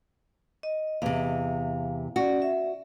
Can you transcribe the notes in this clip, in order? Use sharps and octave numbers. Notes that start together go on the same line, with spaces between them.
D#5
E2 C3 F5
C#4 F#4 D5
E5